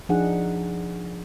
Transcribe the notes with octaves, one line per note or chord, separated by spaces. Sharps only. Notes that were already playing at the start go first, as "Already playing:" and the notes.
F3 D4 D#4 G#4 F#5